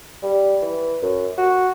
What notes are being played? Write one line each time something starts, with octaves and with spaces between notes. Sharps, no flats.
G3
E3
F#2
F#4